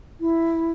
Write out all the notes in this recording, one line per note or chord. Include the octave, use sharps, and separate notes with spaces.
E4